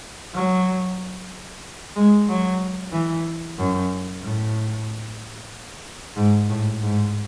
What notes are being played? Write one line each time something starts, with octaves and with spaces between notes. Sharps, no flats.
F#3
G#3
F#3
E3
F#2
A2
G#2
A2
G#2